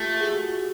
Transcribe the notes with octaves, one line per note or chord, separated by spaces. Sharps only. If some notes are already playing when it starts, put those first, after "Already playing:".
Already playing: A3 F4 G4
F#4 G#4